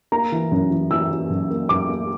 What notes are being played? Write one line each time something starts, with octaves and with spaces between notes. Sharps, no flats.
A#3 A#5
E3
F#2
E3
E3 E6
E3
F#2
A#3
F#2 D6
A#3